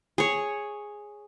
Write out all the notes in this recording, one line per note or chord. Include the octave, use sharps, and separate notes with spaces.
G#4 C#5